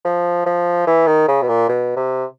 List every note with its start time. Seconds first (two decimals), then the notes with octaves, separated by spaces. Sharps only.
0.05 F3
0.46 F3
0.87 E3
1.07 D#3
1.28 C#3
1.43 B2
1.48 A#2
1.69 B2
1.96 C3